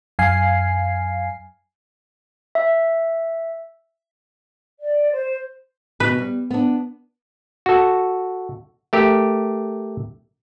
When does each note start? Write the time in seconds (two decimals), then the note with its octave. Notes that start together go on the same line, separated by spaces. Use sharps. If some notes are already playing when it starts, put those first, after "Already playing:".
0.19 F#2 F5 G#5 C7
2.55 E5
4.80 D5
5.11 C5
6.00 B2 B4
6.18 G3
6.51 B3 D4
7.66 F#4 A4
8.93 A3 G4 A#4